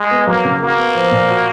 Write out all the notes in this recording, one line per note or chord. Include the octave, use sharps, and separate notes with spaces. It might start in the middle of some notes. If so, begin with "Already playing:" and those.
Already playing: G#3
B3
F#3 A#3
C#3
A#3 F#4
B3
F3
A#2
F#4